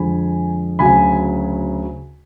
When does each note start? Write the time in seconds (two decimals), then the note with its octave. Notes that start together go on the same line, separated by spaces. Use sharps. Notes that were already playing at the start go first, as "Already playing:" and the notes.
Already playing: F2 D3 G#3 G#5 B5
0.79 D2 C#3 F#3 G#5 B5